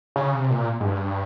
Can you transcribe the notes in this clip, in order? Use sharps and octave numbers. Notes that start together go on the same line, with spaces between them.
C#3
C3
A#2
G#2
G2